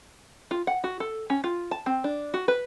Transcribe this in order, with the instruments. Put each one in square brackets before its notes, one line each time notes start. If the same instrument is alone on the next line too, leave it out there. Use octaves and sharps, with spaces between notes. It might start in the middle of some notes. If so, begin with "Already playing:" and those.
[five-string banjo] F4
F#5
F#4
A4
C#4
F4
A5
C4
D4
F#4
B4